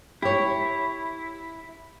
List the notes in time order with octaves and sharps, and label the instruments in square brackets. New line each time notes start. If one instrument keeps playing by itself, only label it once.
[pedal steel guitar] E4 [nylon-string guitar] G4 C#5